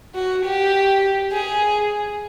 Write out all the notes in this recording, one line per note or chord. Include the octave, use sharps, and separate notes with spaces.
F#4
G4
G#4